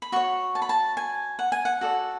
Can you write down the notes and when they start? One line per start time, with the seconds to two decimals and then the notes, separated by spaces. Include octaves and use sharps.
0.02 B5
0.12 F#4 C#5 C#6
0.55 A5
0.62 B5
0.69 A5
0.97 G#5
1.39 F#5
1.52 G#5
1.65 F#5
1.81 F#4 A4 D5